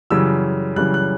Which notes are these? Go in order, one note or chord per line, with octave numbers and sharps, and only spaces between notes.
F#2 C#3 E3 G3 E6
F#2 C#3 E3 G3 F#6
F#6